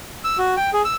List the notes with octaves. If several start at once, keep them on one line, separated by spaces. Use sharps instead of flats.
E6
F#4
G5
G#4
E6